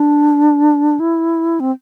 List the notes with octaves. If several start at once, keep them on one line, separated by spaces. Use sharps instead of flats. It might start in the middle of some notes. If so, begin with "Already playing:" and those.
Already playing: D4
E4
C4